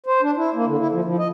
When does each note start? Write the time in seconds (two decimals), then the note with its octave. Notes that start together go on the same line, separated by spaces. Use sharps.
0.06 C5
0.22 D4
0.37 E4
0.54 A#3
0.66 D3
0.79 E4
0.92 F3
1.05 F3
1.19 D#5